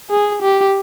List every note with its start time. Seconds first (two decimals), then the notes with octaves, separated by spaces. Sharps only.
0.10 G#4
0.42 G4